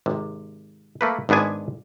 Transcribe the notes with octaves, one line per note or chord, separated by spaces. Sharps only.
G#1 C3
A3 A#3 B4
G#1 G#2 B3 D4 G#5